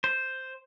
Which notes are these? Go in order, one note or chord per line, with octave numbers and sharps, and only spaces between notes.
C5